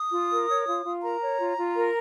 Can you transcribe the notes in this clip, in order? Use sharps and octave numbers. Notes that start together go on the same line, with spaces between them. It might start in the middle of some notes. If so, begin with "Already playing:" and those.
Already playing: D#6
F4
A#4
C#5
F4
F4
A#4 A#5
C#5
F4
F4
A#4